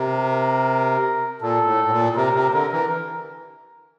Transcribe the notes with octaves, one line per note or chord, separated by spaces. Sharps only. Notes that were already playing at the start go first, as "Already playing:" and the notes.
Already playing: C3 A#4
A#4
A#2 A4
A2
A2
A#2
C3 A#4
C3
D3 A#4
E3